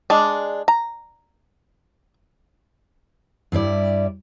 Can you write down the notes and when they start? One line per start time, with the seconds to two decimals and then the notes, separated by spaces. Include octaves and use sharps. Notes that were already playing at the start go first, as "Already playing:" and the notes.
0.10 G#3 D4
0.68 A#5
3.52 G2 G3 E4 D5